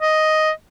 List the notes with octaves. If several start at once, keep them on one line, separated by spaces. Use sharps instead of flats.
D#5